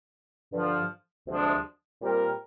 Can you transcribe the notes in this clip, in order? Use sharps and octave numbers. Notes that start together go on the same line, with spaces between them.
G2 D3 F3
D2 C3 F3 G#3 D4
A#2 G3 C4 G4 A#4